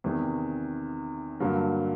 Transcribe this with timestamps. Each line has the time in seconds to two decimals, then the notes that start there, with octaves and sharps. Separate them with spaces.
0.04 E2 C3 D#3
1.40 G2 D3 F#3 A#3